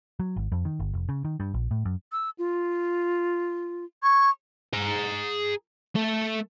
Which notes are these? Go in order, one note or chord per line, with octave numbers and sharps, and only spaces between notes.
F#3
G#1
F2
D#3
G1
F1
C#3
D#3
G2
A#1
A2
F#2
E6
F4
C#6 G#6
G#4 A#5
A3 A4